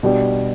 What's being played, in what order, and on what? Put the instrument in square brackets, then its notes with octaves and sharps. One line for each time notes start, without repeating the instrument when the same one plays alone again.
[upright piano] B2 G3 D4 G4